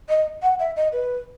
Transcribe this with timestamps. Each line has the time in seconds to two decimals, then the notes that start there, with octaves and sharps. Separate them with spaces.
0.09 D#5
0.43 F#5
0.60 E5
0.77 D#5
0.93 B4